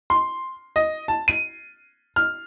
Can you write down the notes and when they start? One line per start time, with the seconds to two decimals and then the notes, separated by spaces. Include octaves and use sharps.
0.10 C6
0.76 D#5
1.08 A5
1.28 D#7
2.16 F6